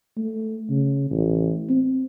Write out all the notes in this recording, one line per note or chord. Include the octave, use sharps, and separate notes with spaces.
A3
C#3
A1
C4